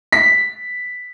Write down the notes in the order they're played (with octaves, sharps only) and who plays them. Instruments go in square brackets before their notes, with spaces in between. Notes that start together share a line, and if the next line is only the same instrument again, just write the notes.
[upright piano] B6